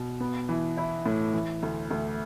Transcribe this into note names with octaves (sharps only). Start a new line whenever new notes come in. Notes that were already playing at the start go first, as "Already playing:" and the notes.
Already playing: B2
B3
E3
E4
A2
E3
D2
D2